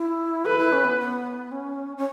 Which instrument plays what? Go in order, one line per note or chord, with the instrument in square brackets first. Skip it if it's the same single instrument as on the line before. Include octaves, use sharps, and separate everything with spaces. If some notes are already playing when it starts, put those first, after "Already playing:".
Already playing: [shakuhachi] E4
[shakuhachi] A4 [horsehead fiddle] B4
[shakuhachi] E4
C#4
B3
B3
C#4
C#4